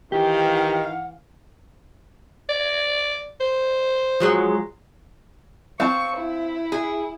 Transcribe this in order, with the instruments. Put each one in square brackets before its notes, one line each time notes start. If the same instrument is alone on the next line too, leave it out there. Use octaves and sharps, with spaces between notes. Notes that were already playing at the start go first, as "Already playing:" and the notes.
[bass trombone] D#3 [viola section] E3 F5 [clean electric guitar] G4
[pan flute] F#5
[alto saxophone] D5
C5
[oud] F3 F#3 G#3
[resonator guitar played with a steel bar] C4 [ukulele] F5 A5 [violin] C#6
[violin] E4
[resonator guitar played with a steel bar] G#4